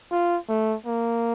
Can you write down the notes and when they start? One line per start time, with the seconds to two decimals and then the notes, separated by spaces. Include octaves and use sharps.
0.11 F4
0.49 A3
0.86 A#3